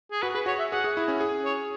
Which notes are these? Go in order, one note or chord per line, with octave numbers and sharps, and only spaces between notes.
G#4
F#4 B4
G#4 B4
F#4 C#5
E5
G#4 F#5
G#4
E4
C#4
G#4
C#5